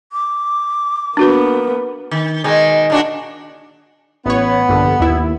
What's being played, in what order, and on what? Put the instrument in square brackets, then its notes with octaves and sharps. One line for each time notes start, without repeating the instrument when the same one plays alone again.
[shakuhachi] D6
[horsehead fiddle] A#3 B3 [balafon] D4 F#4 B4
[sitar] D#3
B2 D#3 G#3
A#2 D4 F#4
[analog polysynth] A1 C#5 [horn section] B3
[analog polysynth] A#1 G2 D3
D#2 E4